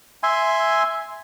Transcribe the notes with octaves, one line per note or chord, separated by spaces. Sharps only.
E5 G#5 C6